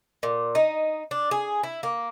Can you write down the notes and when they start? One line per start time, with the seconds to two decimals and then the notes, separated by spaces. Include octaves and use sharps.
0.23 A#2
0.55 D#4
1.11 D4
1.31 G#4
1.63 E4
1.83 A#3